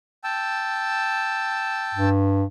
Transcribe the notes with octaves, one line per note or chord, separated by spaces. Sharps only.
G5 A5 E6
G2